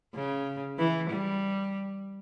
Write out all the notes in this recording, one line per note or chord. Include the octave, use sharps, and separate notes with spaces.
C#3
E3
G3